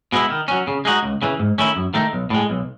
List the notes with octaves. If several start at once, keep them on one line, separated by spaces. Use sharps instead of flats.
B2 G#3 B3 E4
D#3
F#3 C#4
C#3
G#3 D#4 F#4
C#2
C#3 E3
G#2
D#3 A3 C#4 E4
F#2
D#3 A3 D#4
B1
A2 G#3
B1